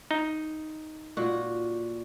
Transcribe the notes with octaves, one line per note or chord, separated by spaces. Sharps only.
D#4
A#2 F#4